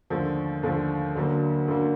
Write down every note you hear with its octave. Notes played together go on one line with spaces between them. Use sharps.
D#2 D3 F3 A3
D#2 D3 F3 A3
D2 D3 F#3 A#3
D2 D3 F#3 A#3